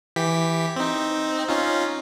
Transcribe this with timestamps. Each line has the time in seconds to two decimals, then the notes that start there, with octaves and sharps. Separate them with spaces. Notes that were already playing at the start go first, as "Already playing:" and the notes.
0.16 E3 G4 B6
0.76 C4 D#4
1.48 C#4 D#4 F4